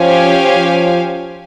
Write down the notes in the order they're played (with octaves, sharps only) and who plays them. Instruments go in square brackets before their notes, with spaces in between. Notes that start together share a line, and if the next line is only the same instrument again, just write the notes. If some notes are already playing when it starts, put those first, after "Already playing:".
Already playing: [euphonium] F3 [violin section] C#4 G4 C5 F5 G#5
[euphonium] F3